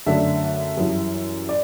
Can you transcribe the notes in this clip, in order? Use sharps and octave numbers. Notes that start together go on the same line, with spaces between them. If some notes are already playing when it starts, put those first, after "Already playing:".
F#2 D3 A3 D4 E5
F#2 E3 G3
D5